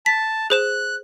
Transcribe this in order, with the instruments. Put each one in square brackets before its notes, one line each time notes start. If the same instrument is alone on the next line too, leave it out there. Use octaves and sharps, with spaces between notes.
[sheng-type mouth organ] A5 [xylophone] B6
[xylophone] G#4 C5 E7 [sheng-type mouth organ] F#6